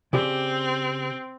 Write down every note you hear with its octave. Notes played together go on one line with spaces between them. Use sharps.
C#3 C4 G4 D5